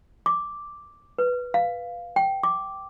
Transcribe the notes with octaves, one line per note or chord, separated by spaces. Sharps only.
D6
B4
F5
G5
D6